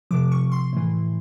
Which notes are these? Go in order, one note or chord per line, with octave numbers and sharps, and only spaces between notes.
C3 F3 D6
C#6
C6
A2 E3